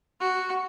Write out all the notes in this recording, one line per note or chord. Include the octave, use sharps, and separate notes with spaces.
F#4